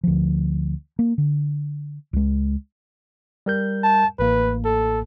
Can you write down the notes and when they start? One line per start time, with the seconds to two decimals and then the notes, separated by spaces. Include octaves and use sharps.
0.03 D2 F3
0.99 A#3
1.18 D3
2.13 C#2 G#3
3.46 G3 A#4 G6
3.83 A5
4.19 A1 A2 A#3 B4
4.65 A4